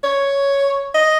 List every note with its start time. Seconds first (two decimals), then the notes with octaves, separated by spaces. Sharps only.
0.03 C#5
0.95 D#5